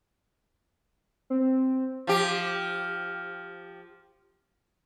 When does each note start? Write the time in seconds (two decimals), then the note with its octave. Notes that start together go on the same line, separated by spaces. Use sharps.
1.30 C4
2.07 F3 G4